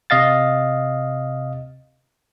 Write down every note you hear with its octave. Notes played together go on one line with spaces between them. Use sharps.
C3 D#5 F5 A6